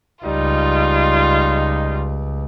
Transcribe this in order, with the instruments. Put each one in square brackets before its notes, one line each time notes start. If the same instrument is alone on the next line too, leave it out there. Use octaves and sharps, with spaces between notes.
[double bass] C#2 [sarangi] G3 [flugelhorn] D#4 [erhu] F4